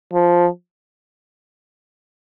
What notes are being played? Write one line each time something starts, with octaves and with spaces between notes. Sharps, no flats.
F3